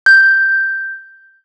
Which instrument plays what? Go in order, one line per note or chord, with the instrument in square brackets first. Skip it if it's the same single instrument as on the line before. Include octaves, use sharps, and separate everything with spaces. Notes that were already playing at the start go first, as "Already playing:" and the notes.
[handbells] G6